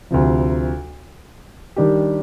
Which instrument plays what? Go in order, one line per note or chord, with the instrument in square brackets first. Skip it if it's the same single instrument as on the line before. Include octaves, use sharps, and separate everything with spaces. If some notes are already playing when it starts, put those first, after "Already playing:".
[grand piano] D2 C3 F3
D#3 G3 D4 G4